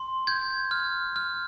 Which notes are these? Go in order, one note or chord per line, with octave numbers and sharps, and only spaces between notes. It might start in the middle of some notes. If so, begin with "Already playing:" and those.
Already playing: C6
G6 G#6
F6
F6